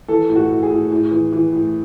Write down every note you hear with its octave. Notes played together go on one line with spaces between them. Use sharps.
E3 A4
A2
F#4
A2
G#4
A2
A2
E3
E3
A2